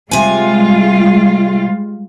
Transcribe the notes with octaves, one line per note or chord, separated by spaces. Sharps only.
C3 G3 G#3 F4 G#5